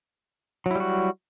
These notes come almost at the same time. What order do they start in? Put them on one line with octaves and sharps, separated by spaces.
F#3 E4 G3 F#4